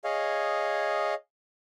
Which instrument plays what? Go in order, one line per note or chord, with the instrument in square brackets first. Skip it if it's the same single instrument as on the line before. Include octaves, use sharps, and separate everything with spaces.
[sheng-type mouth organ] G#4 C#5 D#5 F5